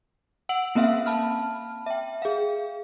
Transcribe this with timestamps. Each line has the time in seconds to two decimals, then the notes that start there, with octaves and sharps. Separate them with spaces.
0.49 F#5 E6 D7 F#7
0.75 A#3 C4 C#4 E5 F5
1.06 A5 B5 F6
1.86 E5 G5
2.22 G#4 F5